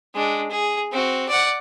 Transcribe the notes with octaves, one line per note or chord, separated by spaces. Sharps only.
G#3 D4
G#4
C4 F#4
D5 F#5